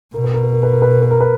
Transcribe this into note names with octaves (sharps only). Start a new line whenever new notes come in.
B2 A#4
B4
A#4
B4
A#4
B4
A#4
B4
A#4
B4
A#4
B4